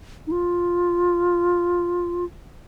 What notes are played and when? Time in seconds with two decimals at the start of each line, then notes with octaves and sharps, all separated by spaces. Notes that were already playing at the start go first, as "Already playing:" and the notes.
0.27 D#4
0.31 F4